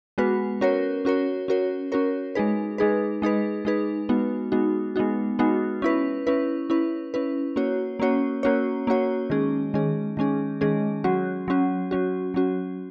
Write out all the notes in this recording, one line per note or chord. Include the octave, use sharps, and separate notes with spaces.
G#3 B3 F#4 B4
C#4 F#4 A#4 C#5
C#4 F#4 A#4 C#5
C#4 F#4 A#4 C#5
C#4 F#4 A#4 C#5
G#3 D#4 G#4 B4
G#3 D#4 G#4 B4
G#3 D#4 G#4 B4
G#3 D#4 G#4 B4
G#3 B3 D#4 F#4
G#3 B3 D#4 F#4
G#3 B3 D#4 F#4
G#3 B3 D#4 F#4
C#4 E4 B4
C#4 E4 B4
C#4 E4 B4
C#4 E4 B4
A#3 C#4 F#4 C#5
A#3 C#4 F#4 C#5
A#3 C#4 F#4 C#5
A#3 C#4 F#4 C#5
D#3 G#3 C#4 G#4
D#3 G#3 C#4 G#4
D#3 G#3 C#4 G#4
D#3 G#3 C#4 G#4
F#3 C#4 F#4
F#3 C#4 F#4
F#3 C#4 F#4
F#3 C#4 F#4